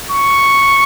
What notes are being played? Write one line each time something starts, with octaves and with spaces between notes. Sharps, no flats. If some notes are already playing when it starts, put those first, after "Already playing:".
C#6